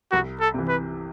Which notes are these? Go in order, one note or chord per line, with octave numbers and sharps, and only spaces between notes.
C2 F#4
A4
C3 E3
B4